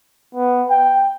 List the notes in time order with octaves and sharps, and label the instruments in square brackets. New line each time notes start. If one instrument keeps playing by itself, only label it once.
[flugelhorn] B3
G5